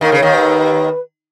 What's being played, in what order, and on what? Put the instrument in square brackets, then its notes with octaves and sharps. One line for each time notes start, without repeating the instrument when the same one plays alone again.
[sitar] D#2 D#3 [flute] A#4
[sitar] C#3
[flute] C#5
[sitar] D#2 D#3
[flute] B4